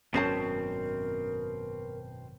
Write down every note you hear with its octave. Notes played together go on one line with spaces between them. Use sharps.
G#1 F#2 B2 C4 C#4 A#4 C5 A5